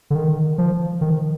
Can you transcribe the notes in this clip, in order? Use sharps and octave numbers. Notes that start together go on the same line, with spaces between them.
D3
D#3
F3
D#3